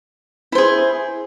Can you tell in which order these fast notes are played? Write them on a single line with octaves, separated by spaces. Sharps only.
E4 C5 G#4